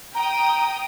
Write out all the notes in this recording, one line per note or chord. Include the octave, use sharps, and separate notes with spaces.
G5 A#5 D#6